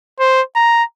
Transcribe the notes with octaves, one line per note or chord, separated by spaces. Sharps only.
C5
A#5